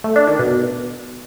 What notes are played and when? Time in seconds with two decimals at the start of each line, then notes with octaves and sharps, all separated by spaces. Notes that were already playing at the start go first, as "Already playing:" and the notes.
0.04 A3
0.16 D4
0.27 D#3
0.39 B2